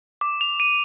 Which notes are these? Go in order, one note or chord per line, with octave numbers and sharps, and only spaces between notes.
D6
F7
D#7